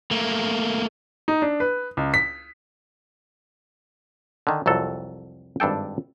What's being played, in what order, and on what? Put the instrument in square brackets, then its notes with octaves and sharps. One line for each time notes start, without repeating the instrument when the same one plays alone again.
[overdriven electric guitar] A3 A#3
[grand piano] D#4
D4
B4
C#2
B6
[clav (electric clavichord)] D3 D#3
C2 F2 F#3 A4
G#1 G2 D4 A4 G5